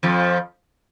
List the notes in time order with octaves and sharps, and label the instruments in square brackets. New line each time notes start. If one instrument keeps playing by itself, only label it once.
[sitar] F2 F3